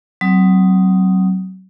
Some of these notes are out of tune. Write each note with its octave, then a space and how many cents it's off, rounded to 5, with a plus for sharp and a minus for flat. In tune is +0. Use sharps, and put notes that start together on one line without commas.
F#3 +30 C4 +0 D#6 +0